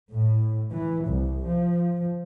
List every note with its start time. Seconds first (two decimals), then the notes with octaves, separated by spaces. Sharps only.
0.12 A2
0.72 E3
1.06 C2
1.48 F3